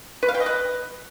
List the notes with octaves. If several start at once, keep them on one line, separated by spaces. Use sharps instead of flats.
B4
F5
G5
D#5
B4